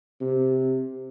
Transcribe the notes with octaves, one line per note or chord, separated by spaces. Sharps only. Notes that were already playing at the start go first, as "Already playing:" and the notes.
C3